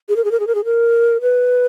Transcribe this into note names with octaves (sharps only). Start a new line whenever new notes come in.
G#4
A#4
G#4
A#4
G#4
A#4
G#4
A#4
B4